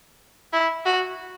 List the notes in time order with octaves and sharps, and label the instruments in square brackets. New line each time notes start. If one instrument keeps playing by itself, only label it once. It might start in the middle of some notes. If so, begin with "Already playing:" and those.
[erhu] E4
F#4